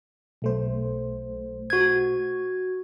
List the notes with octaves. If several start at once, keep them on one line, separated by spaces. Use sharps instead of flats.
B1 A3 C5
F#4 G#6